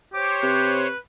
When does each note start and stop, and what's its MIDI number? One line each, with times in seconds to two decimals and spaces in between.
0.14 0.87 67
0.14 0.87 72
0.14 0.87 73
0.14 0.33 86
0.43 0.90 48
0.43 0.98 71